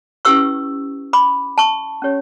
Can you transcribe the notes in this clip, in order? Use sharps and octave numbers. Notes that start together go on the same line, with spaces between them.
C#4 E4 G4 B4 C#6 E6
B5 D6
A5 C#6
C#4 G4 C#5